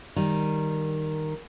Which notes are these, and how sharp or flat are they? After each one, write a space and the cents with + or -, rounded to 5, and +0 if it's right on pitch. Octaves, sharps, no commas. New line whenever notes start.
D#3 -5 G3 +0